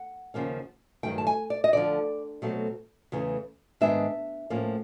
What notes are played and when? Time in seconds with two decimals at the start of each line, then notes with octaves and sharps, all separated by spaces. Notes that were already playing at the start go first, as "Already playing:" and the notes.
Already playing: F#5
0.34 D#2 C#3 F3 A#3 C#4
1.03 G2 D#3 F#3 A3 G5
1.18 A5
1.27 G#5
1.50 D5
1.64 D#5
1.73 D2 D3 F3 D5
2.42 B2 F#3 A3 C4
3.12 E2 C#3 E3 A3
3.81 G#2 D#3 G#3 B3 D4 E5
4.50 A2 F3 A#3 C#4